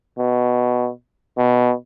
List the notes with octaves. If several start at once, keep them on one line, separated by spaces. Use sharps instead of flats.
B2
B2